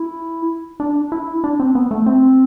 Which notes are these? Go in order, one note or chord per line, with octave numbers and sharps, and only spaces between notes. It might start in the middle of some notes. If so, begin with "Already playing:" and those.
Already playing: E4
D4
E4
D4
C4
B3
A3
C4